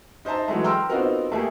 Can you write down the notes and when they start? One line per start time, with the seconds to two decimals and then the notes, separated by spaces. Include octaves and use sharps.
0.25 D#4 C5 E5 A5 A#5
0.48 E3 F#3 G#3 A3
0.64 G5 A#5 C6 E6 F6
0.89 B3 C4 D#4 F4 F#4 A#4
1.32 A3 A#3 G4 G#4